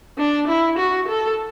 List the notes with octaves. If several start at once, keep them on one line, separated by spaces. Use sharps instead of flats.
D4
E4
F#4
A4